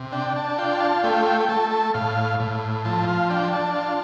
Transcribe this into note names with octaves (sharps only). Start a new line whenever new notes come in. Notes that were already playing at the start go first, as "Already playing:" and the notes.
Already playing: C3
D4 G5
A5
F4 G5
A5
A3 G5
G5
G5
A3 A5
A5
A2 F5
A2
F3 A5
F5
D4 G5
A5
F4